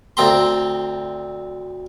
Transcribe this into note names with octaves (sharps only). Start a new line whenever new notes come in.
D2 C4 A#5 C6